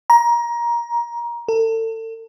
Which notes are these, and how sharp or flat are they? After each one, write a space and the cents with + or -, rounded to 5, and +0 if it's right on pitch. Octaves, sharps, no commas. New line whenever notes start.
A#5 +20
A4 +35